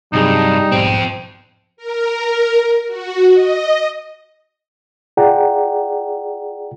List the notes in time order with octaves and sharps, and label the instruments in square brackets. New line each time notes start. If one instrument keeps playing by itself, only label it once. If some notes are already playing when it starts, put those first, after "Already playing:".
[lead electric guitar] G2 [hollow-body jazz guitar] C3 F#3 G#4 [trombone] G3 [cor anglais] D#4
[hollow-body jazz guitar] B1 G#2 C5 [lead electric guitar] F2 C4
[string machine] A#4
F#4
D#5
[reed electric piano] F4 G#4 D5 F#5 G5 A#5